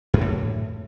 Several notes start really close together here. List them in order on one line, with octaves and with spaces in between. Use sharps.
F#2 E3 D3 A2